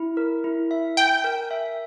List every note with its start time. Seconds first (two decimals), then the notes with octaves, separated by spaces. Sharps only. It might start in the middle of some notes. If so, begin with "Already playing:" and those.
Already playing: E4
0.17 A#4
0.44 E4
0.71 E5
0.97 G5 G#5
1.24 A#4
1.51 E5